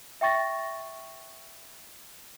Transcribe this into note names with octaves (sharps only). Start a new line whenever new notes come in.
E5 G5 C#6 A6 A#6